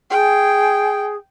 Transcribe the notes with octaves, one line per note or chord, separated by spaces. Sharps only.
G#4 G5